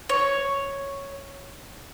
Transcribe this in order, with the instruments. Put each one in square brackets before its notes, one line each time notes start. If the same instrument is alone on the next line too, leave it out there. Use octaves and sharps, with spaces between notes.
[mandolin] C#5